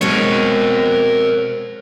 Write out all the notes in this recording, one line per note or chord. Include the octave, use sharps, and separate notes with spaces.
B2 G#3 C4 A#4 C#5